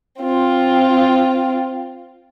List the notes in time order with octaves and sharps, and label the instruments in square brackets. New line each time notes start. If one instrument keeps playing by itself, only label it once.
[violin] C4 F4